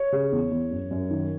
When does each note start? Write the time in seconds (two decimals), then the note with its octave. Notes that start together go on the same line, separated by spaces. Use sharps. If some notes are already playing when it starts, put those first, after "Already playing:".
Already playing: C#5
0.12 C#3
0.32 E2
0.51 E2
0.71 F#2
0.91 F#2
1.10 D#3